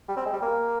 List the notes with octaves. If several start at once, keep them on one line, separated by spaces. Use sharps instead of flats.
G3
C4
G#3
G3
A#3